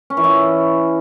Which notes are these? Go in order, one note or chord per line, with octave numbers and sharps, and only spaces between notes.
C#4
E3
E4